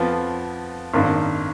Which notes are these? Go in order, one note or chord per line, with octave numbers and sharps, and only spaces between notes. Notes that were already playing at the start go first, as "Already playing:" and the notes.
Already playing: F2 F3 B3 F4
G#1 F#2 D#3 A#3 D4